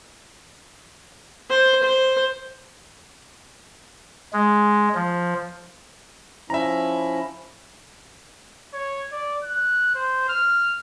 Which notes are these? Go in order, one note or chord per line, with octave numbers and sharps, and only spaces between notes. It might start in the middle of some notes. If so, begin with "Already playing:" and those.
C5
C5
G#3
F3
F3 C#4 E4 E5 A#5
C#5
D5
F#6
C5
F6